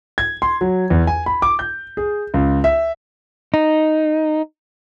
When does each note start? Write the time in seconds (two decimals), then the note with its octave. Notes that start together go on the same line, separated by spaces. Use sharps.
0.18 G#6
0.42 C6
0.61 F#3
0.90 E2
1.07 G#5
1.26 B5
1.42 D6
1.59 G6
1.97 G#4
2.34 C#2
2.64 E5
3.54 D#4